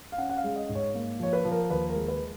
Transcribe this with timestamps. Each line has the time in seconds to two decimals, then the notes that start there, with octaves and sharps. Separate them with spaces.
0.12 F5
0.18 C#4 F#5
0.30 F#5
0.37 F5
0.44 G#3
0.56 D#5
0.69 G#2
0.75 C#5
0.94 A#3
1.20 F3 C#5
1.33 B4
1.45 F3
1.52 A#4
1.70 D#2 B4
1.89 A#4
1.95 G#3
2.08 B4